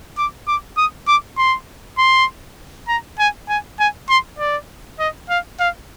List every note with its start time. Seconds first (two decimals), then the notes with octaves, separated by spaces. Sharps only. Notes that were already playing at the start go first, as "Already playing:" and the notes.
0.18 D6
0.48 D6
0.77 D#6
1.08 D6
1.38 C6
1.98 C6
2.88 A#5
3.19 G#5
3.49 G#5
3.79 G#5
4.09 C6
4.39 D5
5.00 D#5
5.30 F5
5.60 F5